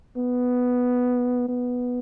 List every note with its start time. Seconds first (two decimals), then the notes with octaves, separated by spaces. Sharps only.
0.17 B3
1.49 B3